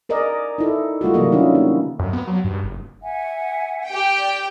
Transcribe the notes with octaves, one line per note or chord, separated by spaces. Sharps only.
G#4 A#4 D5 D#5
D#4 E4 A4
G3 A3 F4 F#4
C3 E3 F#3 A#3 D#5
D#3 C#4 D4 E4 F4
A#3
F#2
B3
F#3
G2
F#1
E5 F#5 G#5
G4 G5
D5